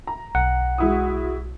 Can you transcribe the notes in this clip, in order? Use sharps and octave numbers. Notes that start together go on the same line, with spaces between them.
A#5
B1 F#5
G#3 E4 F#4 D#6